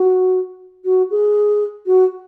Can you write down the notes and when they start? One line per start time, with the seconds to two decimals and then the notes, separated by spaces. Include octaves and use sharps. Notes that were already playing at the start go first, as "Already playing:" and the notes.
Already playing: F#4
0.85 F#4
1.11 G#4
1.86 F#4